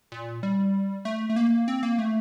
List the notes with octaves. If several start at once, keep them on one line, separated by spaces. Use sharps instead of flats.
A#2
G3
A3
A3
A#3
C4
A#3
A3